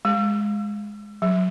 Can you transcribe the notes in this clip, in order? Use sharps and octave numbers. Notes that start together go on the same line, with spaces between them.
G#3
F#3